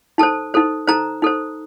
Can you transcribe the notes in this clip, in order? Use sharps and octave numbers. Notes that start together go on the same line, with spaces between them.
D#4 A4 C5 A5
D#4 A4 C5
D#4 A4 C5 A#5
D#4 A4 C5